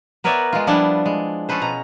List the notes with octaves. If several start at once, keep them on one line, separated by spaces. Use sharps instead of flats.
B3 A#4 B4 C#5 D5 E5
G#3 F4
F3 G3 B3 D4 E4 F4
G#3
C#4 G#4 A4 B4 C5
B2 A#5